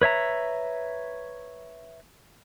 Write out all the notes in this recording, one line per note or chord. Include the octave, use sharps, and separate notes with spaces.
B4 C#5 E5 A#5